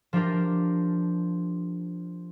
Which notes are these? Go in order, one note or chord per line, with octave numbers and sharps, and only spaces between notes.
F3 D4 F4 G4 A#4